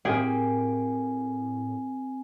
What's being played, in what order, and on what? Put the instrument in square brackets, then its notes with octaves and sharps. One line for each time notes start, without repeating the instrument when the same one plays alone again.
[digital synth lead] A2 [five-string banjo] A#3 G4 [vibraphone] C4 G#5 [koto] G#4